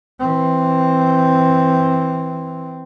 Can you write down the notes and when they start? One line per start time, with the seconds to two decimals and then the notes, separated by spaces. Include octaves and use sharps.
0.20 E3 C4